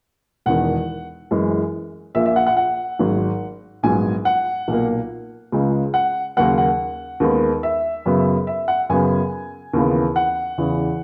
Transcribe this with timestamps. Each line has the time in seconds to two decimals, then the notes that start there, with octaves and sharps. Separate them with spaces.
0.46 E1 E2 D#3 F#5
1.31 F#2 E3 G#3
2.14 A#1 A#2 A#3 E5
2.26 E5
2.36 F#5
2.46 F#5
2.57 F#5
2.99 G#1 G#2 F#3
3.83 A#1 G#2 F#3 B3 G#5
4.25 F#5
4.68 B1 A#2 A#3
5.52 C#2 C#3 G#3
5.94 F#5
6.37 D#2 C#3 F#3 A#3 F#5
6.58 F#5
7.20 D#2 D#3 G#3 B3
7.63 E5
8.05 F#2 C#3 F#3 B3
8.47 E5
8.68 F#5
8.89 F#2 C#3 F#3 B3 G#5
9.73 D#2 C#3 E3 B3
10.16 F#5
10.58 E2 C#3 E3